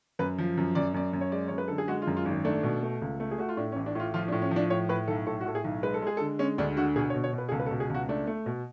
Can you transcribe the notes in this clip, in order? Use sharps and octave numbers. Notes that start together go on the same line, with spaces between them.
F#2 B4
F3
F#2
F#2 D5
F#2 D5
F#2
C#5
G#3 D5
F#2 C#5
B4
D3 A4
G#4
G#3 F#4
F4
F#2
F4
G#1
A3 D4
B2
A3
C#2
A3
G#4
A3 F#4
F4
A2 D4
C#4
A1
D4
A2 F4
F3 F4
D4
A2
C#4
F3 D4
A2 C#5
A2 B4
B1 A4
A2 A4
F#4
A2 A4
G#4
B1
G#3 B4
A4
G#3 G#4
A4
D3
G#3 C#4
D2 D4
D3 F#4
B2 G#4
C#5
B2
C#5
B2
B4
G#4
C#2 A4
B4
A4
B2
G#4
C#2 F#4
A3 D4
A3
B2